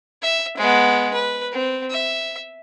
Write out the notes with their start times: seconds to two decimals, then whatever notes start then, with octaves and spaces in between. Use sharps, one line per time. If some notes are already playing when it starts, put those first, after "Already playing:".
0.22 E5
0.57 G#3 B3
1.14 B4
1.52 C4
1.90 E5